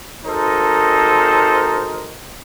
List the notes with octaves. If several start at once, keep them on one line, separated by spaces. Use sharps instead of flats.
G#1 D#4 A4 A#4 C5